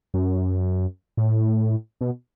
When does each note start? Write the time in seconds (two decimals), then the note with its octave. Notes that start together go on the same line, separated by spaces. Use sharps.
0.14 F#2
1.17 A2
2.01 B2